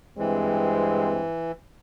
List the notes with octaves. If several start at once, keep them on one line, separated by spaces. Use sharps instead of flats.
G2 E3 G#3 C4